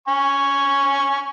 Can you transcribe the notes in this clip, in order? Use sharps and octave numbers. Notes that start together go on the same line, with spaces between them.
G#5 C#6